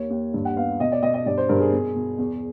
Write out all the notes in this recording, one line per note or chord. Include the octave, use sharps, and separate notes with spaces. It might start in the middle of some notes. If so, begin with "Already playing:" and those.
Already playing: D#2 A#3 C#5
D#2
G2
F#5
B3 F5
B2 D#5
D5
B2 D#5
D#5
G2 D5
C5
G2 A#4
G#4
B2
B2
E2